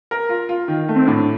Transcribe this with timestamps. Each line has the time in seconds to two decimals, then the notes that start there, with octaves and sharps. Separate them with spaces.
0.11 A#4
0.29 F4
0.49 F4
0.68 D#3
0.89 A3
0.96 C4
1.07 A2 D4